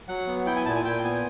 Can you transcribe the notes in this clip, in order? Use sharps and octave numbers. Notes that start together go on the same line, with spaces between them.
F#3 F#5
B3
E4 G5
G#5
A#2 A5
G#5
A#2 G5
B3 G#5